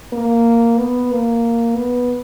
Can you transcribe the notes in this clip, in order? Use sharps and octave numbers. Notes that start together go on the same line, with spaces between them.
A#3
B3
A#3
B3